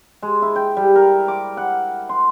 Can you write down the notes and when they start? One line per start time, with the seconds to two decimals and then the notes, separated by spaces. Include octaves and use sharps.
0.22 G#3
0.42 E4
0.56 G5
0.77 G3
0.96 A#4
1.28 D6
1.57 F#5
2.09 C6